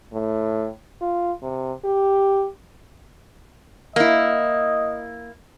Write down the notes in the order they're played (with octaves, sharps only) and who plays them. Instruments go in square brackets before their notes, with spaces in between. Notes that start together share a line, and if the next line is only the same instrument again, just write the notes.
[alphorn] A2
F4
C3
G4
[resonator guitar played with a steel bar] A#3 E4 [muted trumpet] D#5